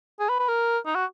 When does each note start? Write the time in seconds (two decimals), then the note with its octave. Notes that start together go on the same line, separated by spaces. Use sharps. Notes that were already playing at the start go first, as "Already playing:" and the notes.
0.20 G#4
0.29 B4
0.39 B4
0.48 A#4
0.86 D#4
0.95 F#4